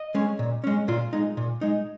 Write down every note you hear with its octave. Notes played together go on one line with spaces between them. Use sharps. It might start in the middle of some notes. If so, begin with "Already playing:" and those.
Already playing: D#5
G#3 C#4
A#2
G#3 C#4
A#2 F4
G#3 D#4
A#2
G#3 D#4